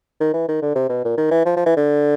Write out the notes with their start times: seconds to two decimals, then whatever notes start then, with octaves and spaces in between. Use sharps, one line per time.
0.21 D#3
0.34 E3
0.48 D#3
0.62 D3
0.75 C3
0.89 B2
1.04 A#2
1.17 D#3
1.31 E3
1.46 F3
1.56 F3
1.66 E3
1.77 D3